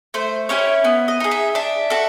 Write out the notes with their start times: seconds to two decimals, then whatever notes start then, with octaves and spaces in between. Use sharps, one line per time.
0.14 A3 C5
0.49 C#4 E4 G4 C#5
0.84 B3
1.08 D#5
1.20 D#4 G#4
1.31 E5
1.55 D4 E5
1.90 F#4 A4